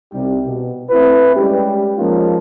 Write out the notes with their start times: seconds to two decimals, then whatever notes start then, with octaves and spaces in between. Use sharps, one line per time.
0.13 C2 C3 G3 D#4 G4
0.46 B2
0.90 A3 C4 E4 B4
1.36 G3 G#3 C#4 G4
1.97 F3 G#3 A#3 C#4 D#4 F4